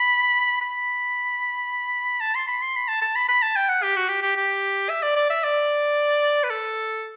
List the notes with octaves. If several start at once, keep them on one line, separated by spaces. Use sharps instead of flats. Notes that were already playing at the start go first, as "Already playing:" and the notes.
Already playing: B5
B5
A5
C6
B5
C6
B5
A5
A5
B5
B5
A5
G5
F#5
G4
F#4
G4
G4
G4
E5
D5
D5
E5
D5
B4
A4